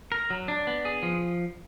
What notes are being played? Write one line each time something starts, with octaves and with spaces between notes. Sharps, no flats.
A#4
F#3
D4
B3
G#4
F3